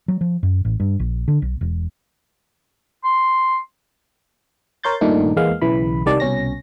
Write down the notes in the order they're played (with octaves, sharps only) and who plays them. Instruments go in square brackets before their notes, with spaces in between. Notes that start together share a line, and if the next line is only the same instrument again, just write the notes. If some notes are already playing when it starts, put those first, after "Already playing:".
[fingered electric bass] F#3
F3
F#2
A1
G2
A#1
D3
B1
E1
[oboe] C6
[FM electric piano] A#4 C#5 C6 G6 A6
G2 A#2 D#3 A3 D4 D#4
E2 G#3 A#3 B3 F5
B1 C#3 E3 B5
C2 D#3 G3 D5 A5
C2 B2 C#4 A#6